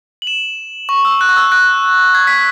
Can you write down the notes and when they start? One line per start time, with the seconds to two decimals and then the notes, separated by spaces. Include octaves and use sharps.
0.22 F#7
0.27 E7
0.89 C#6
1.05 E6
1.21 F#6
1.29 C#6
1.36 E6
1.52 F#6
2.15 G#6
2.27 B6